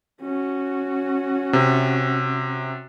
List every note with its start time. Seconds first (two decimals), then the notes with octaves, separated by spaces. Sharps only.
0.21 C#4 F#4
1.53 C3